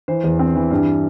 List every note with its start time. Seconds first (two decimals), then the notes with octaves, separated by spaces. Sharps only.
0.08 E3 C5
0.24 E2
0.39 C4
0.55 E3
0.71 G2